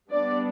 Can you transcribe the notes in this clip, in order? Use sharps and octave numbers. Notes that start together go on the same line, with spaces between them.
G3 B3 D4 D5